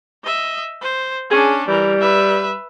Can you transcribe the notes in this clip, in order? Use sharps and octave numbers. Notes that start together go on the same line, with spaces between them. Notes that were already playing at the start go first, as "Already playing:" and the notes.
D#5 E5
C5
C#4 D4 G#4
E3 G3 A#4
B4 E5